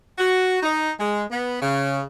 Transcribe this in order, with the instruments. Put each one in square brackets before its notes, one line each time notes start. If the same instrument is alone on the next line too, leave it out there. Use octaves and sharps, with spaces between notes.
[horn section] F#4
D#4
G#3
B3
C#3